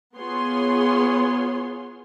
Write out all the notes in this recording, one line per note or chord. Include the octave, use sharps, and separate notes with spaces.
B3 F4 G#4 C#5 C6